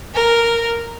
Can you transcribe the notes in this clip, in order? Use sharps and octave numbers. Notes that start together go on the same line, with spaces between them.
A#4